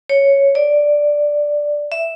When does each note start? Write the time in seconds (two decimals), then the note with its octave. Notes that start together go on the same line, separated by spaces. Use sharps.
0.09 C#5
0.55 D5
1.92 E5